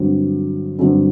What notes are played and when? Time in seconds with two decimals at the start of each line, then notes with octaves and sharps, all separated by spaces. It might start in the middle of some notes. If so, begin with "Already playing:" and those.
Already playing: G2 D3 F#3 C4
0.79 G2 D3 F#3 C4